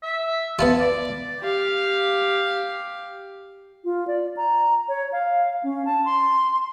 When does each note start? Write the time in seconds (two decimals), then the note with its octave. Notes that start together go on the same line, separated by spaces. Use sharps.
0.03 E5
0.59 B3 E4 F4 A5
0.80 D5
1.40 G4 F5
3.84 F4
4.08 D5
4.37 A#5
4.88 C#5
5.12 F5
5.63 C#4
5.85 A5
6.05 C6